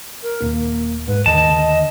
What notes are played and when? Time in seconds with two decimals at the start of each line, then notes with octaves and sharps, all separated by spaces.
0.23 A#4
0.42 D#1 A#3
1.08 G#2 B4
1.26 D#2 D3 D#5 A5